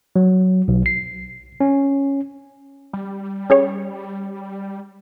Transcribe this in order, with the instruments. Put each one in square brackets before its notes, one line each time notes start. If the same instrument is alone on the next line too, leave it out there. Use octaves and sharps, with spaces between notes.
[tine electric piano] F#3
B1
C7
C#4
[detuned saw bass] G3
[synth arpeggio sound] C#4 G#4 C#5